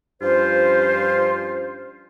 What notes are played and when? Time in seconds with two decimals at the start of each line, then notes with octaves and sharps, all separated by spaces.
0.22 G2 F3 C#4 F4 C5